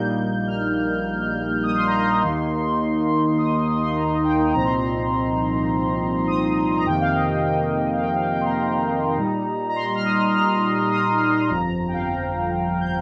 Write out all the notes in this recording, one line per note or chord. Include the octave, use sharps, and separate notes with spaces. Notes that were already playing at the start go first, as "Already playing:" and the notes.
Already playing: A#1 A#2 G3 A#3 D#4 G6
F6
D#6
C6
A#5
C6
D#2 D#3 A#3 D#4
D#6
D#6
C6
A#5
G5
C2 A#2 F3 C4 D#4 A#5
C6
A#5
D#6
A#5
F2 C3 D#3 A#3 G5
F5
D#5
F5
G5
D#5
F5
G5
F5
G5
C6
A#5
A#2 G3 D#4
A#5
C6
F6
D#6
F6
D#6
G1 F2 F3 A#5
A#5
A#5
G5
F5
A#5
G6